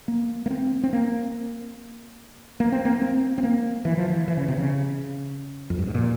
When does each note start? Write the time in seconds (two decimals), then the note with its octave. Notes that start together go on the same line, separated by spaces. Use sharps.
0.08 A#3
0.46 A#3
0.50 C4
0.83 C4
0.93 A#3
2.60 A#3
2.72 C4
2.85 A#3
2.96 A#3
3.02 C4
3.38 C4
3.43 A#3
3.85 E3
3.97 F3
4.10 E3
4.28 E3
4.37 C#3
4.48 C3
4.57 C#3
5.70 F2
5.79 G2
5.87 G#2
5.95 A#2